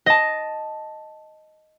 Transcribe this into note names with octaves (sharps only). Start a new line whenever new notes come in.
D#5 A5